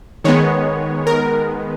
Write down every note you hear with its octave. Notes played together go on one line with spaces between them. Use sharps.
D#3 G#3 B3 C#5
A#4